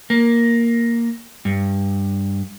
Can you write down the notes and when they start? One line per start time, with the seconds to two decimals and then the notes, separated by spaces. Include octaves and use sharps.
0.10 A#3
1.45 G2